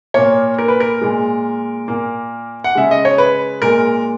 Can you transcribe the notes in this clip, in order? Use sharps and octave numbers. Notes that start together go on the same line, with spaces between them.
A#2 A#3 C#5
A#4
B4
A#4
A#2 G#3
A#2 A#3
F#5
C#3 G#3 E5
D#5
C#5
B4
A#2 G#3 A#4